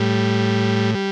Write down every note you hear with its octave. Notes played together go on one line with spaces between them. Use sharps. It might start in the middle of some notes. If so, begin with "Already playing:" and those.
Already playing: A2 G3
G3